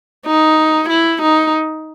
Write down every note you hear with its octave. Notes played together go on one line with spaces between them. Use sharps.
D#4
E4
D#4